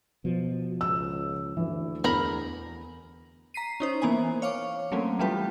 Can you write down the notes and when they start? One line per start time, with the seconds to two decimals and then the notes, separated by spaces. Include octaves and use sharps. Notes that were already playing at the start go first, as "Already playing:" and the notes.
0.25 B2 F3
0.81 C#2 E6
1.57 D2 E3
2.04 E2 A#4 A#5 B5
3.54 A#5 B6 C7 D#7
3.80 C#4 D#4 C5
4.02 E3 A#3 B3 C5 G#5
4.42 C#5 F5 C#6 D6
4.92 F#3 A3 A#3 C4 C#4
5.19 E3 G3 A3 F4 G4 B4